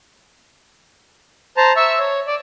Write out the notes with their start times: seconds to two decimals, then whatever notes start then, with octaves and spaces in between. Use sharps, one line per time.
1.57 C5 A5 A#5
1.76 E5 C#6 E6
1.99 C#5
2.27 D5